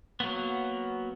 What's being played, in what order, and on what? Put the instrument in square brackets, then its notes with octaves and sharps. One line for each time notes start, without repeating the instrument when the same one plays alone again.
[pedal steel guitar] F#3 A#3 B3